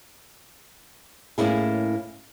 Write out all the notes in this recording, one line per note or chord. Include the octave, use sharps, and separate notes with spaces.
A2 A#3 C#4 E4 G#4